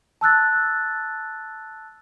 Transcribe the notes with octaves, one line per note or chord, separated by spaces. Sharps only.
A5 E6 F#6 A6